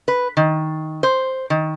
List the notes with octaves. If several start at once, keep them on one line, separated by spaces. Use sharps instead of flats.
B4
D#3
C5
D#3